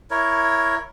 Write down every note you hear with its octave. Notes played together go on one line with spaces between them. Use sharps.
E4 A#4 C#5